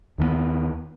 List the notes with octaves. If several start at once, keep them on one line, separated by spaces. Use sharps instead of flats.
D#2 D#3 F3 B3